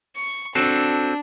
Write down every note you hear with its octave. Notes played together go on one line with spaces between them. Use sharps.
C#6
C4 D4 F#4 A4